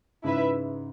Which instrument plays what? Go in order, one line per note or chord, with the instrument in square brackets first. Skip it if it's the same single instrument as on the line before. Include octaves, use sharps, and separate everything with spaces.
[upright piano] G#2 C#3 [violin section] E4 B4 E5